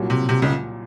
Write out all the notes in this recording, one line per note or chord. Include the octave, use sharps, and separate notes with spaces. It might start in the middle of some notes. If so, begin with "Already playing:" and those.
Already playing: C2 A#2 F#3
C3
C3
C#2 C#3